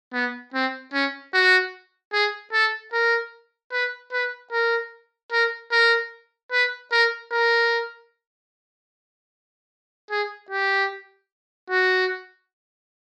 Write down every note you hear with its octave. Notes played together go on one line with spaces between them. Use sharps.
B3
C4
C#4
F#4
G#4
A4
A#4
B4
B4
A#4
A#4
A#4
B4
A#4
A#4
G#4
G4
F#4